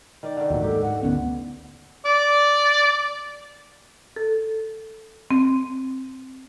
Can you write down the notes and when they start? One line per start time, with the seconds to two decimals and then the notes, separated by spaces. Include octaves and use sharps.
0.23 D#3 D5
0.37 D3 D#3
0.50 D#2 A#2 F#3
0.62 G#2 G4 A4
0.82 F#5
1.03 D2 B3 C#4
2.05 D5
4.16 A4
5.31 C4